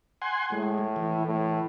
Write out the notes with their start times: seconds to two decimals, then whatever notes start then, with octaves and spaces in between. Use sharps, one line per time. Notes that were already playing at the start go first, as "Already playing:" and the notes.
0.22 F#5 G#5 C6
0.52 A2 G#3
0.96 E3
1.26 A2